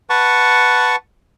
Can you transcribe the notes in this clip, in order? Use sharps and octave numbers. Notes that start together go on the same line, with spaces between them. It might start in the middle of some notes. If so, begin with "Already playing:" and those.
B4 F#5 A5 C#6